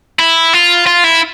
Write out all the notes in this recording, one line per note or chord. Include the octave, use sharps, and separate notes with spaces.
E4
F4
F4
E4